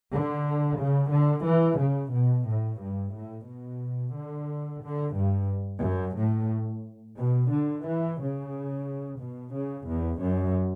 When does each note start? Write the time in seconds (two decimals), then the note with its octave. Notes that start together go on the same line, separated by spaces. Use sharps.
0.11 D3
0.79 C#3
1.12 D3
1.46 E3
1.80 C#3
2.13 B2
2.47 A2
2.81 G2
3.14 A2
3.47 B2
4.15 D3
4.83 D3
5.16 G2
5.83 F#2
6.17 A2
7.18 B2
7.52 D3
7.85 E3
8.19 C#3
9.20 B2
9.53 C#3
9.87 E2
10.21 F#2